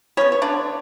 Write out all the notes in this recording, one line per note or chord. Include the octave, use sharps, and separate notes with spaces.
G3 B3 C#4 C#5
C#5
D3 D4 D5